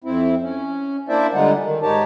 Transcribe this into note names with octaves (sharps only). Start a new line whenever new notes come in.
F2 C4 E4
C#4
A#3 D4 E4 C5 D5 E5
D3 G3 G#3 D#4 F4 F#5
D#3
G#2 D#4 G4 C#5 A5